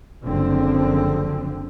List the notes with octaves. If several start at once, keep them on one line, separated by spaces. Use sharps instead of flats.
F#1 D3 F3 C4